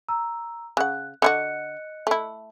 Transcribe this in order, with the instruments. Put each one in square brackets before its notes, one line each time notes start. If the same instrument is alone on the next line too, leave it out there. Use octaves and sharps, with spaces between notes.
[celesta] A#5 E6
[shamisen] C#3 F#5 [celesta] F#6
[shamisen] D3 E4 F#4 [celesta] D#5 F#6 C#7
[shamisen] A3 E4